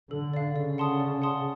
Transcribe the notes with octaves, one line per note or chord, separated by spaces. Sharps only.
D3 A4
D5 F5
C#3 D5
F#5 A5 C6 D#6
D5
F#5 A5 C6 D#6